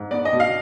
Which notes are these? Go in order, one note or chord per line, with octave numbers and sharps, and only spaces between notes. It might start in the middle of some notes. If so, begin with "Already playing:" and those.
Already playing: G#2
B3 D5
D#5
B2
F5